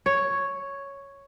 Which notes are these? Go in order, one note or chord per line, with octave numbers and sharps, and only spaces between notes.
C#5